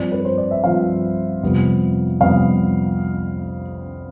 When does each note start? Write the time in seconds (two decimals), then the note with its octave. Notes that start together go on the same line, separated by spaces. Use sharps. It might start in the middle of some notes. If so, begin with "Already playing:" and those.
Already playing: G2 F3 C4 D5
0.12 B4
0.25 C5
0.38 D5
0.51 E5
0.64 G2 F3 C4 F5
1.43 F2 C3 G3 B3
2.21 F2 C3 G3 B3 F5